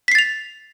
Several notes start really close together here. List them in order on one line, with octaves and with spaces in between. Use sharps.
B6 C7 A6 F7